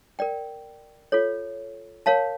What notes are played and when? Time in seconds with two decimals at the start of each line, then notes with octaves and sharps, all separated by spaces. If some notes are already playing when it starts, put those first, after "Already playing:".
0.19 A#4 D5 G5
1.12 F4 A4 C#5
2.06 A#4 C#5 F5 A5